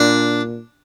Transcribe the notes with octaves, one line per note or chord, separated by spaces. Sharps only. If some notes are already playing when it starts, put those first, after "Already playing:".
Already playing: A#2 D4